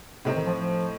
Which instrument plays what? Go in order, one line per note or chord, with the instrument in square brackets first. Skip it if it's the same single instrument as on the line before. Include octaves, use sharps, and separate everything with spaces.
[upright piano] A2 A3 C4 D#4 [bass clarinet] C3
[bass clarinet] D#3
F3
F3